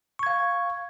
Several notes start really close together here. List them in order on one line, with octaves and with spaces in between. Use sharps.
C#6 G#6 F5